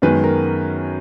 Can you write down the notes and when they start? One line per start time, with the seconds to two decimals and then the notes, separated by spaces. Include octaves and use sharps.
0.02 F#2 D#3 G#3 B3 B4
0.24 A#4